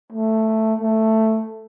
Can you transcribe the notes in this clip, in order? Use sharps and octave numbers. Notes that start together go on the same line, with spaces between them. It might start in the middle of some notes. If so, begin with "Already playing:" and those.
A3
A3